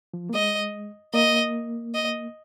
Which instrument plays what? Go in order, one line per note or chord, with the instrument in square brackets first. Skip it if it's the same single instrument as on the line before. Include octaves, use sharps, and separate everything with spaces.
[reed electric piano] F3
A#3
[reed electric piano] G#3 [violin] D#5
[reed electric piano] A#3 [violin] D#5
[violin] D#5